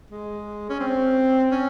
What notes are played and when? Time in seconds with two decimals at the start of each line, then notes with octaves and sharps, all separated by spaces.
0.11 G#3
0.69 C#4
0.80 C4
1.51 C#4